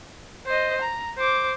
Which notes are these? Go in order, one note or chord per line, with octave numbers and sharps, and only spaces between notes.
C5 D#5
A#5
C5 D6